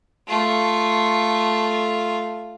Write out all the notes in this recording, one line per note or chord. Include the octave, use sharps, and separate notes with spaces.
A3 F4